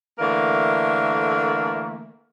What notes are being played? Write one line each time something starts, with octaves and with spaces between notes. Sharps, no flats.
D3 E3 A3 A#3 A#4